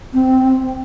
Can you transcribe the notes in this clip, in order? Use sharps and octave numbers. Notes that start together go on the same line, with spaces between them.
C4